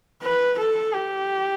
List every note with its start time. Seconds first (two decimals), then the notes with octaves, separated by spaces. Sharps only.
0.23 B4
0.58 A4
0.94 G4